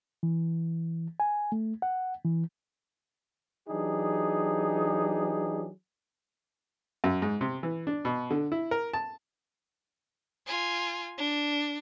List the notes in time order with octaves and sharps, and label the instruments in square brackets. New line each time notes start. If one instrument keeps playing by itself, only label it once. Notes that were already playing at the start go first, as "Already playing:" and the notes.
[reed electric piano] E3
G#5
A3
F#5
E3
[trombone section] E3 F#3 D4 D#4 G4 G#4
[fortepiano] F#2
G#2
C3
E3
D4
B2
D3
E4
A#4
A5
[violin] F4 G#5
D4